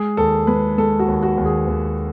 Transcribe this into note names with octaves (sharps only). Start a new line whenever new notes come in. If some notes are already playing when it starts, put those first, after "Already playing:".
Already playing: G#3 G#4
D#2 A4
G#3 B4
G#3 A4
F#4
D#2
F#4
D#2
G#4
D#2